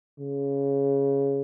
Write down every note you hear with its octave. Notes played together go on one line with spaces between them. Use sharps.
C#3